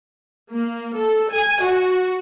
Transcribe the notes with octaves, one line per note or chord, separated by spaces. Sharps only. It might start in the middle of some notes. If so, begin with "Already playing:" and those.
A#3
A4
G#5
F#4